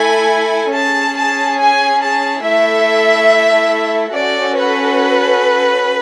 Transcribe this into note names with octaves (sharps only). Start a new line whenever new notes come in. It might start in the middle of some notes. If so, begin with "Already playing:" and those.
Already playing: A3 E4 A4 G#5
C#4 G#4 A5
A5
G#5
A5
A3 E4 A4 E5
C#4 F#4 A4 D5
B4